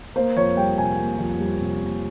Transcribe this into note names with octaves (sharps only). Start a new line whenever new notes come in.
A#3 C5
F2 C#5
G3 G5
C3 G#5
A#3
F2
G3
C3
A#3